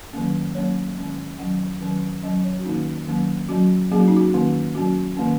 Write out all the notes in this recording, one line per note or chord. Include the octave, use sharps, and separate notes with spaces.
D#3 F#3 A#3 C#4
F#3 A#3 C#4 C#5
D#3 G#3 C#4
D#3 F#3 C#4 F#5
D#3 F#3 C#4
F#3 C#4 D#5
C#5
F#4
D#3 A#3 C#4 D#4
D#3 F#3 A#3 C#4
F#3 C#4 F#4
F#3 A#3 C#4 G#4
F#4
D#4
F#4
D#3 A#3 C#4
F#3 C#4 F#4
D#3 A#3 C#4